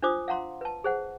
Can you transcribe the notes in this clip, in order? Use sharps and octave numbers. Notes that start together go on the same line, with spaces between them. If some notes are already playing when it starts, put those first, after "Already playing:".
D4 F4 C5 D6 D#6
F5 F#5 A#5 C6
B4 A5
G#4 C5 F#5